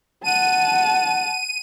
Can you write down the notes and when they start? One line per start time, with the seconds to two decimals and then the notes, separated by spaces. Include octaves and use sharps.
0.24 F#5 A5 D#7